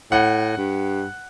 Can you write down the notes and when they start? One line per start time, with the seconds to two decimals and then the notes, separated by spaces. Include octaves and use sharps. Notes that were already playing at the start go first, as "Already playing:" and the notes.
0.12 A2 F#5
0.57 G2